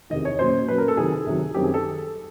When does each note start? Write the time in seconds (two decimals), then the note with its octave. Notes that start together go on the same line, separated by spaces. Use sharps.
0.10 E2 C3 D#3 D#5
0.25 C#5
0.39 A#2 F#3 A#3 C#4 C5
0.68 A#2 F#3 A#3 C#4 B4
0.78 A#4
0.88 A4
0.97 C3 D#3 F#3 G#4
1.26 C3 D#3 F#3
1.54 F#2 D#3 G3 C4 G4
1.64 G#4
1.74 A4